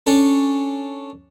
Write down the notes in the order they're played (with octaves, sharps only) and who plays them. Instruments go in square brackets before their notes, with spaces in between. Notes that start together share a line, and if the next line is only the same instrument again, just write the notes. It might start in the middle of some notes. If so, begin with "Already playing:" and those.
[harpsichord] C#4 D4 A4